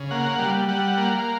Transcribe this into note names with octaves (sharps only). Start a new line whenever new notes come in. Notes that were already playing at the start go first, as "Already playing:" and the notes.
Already playing: C#3
A#3 F#5
G3
G3 F#5
A#3